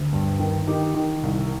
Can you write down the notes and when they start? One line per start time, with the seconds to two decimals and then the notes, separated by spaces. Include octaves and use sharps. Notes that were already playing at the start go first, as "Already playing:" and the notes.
Already playing: D2
0.13 G2
0.39 D#3
0.67 D#3 D#4 G4
0.95 D#3
1.23 C2